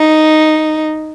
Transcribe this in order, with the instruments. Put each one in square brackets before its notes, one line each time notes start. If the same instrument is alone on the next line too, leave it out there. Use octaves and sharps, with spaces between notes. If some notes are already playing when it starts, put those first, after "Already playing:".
Already playing: [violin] D#4